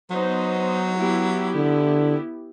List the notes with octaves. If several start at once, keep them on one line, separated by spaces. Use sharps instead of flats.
F#3 B3 D#4 C5
B3 E4 G4
D3